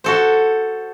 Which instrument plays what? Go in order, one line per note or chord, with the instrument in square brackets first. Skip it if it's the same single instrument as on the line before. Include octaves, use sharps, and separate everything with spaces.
[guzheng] F#4 A4 C5